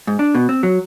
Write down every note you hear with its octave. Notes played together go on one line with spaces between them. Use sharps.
G#2
D4
B2
C4
F#3